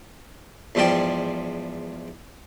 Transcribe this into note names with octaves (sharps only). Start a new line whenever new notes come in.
E2 G#2 F3 G3 C5 G5